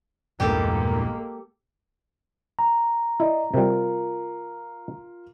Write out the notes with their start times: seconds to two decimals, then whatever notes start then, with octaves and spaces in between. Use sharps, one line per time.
0.40 A#1 E2 G2 G#3 A#3 G4 A4
2.59 A#5
3.20 E4 D5 D#5
3.54 C3 G3 F4 A#4